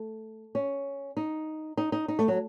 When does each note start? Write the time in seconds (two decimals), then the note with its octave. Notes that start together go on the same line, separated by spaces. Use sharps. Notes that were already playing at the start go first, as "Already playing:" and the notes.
Already playing: A3
0.55 C#4
1.17 D#4
1.77 D#4
1.92 D#4
2.08 D#4
2.19 A3
2.28 F#3